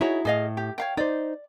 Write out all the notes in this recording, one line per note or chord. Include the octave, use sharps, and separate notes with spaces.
D#4 E4 F#4 G#4 C#5
A2 G#4 D#5 F5
G4
C#5 F5 G5
D#4 C5 D5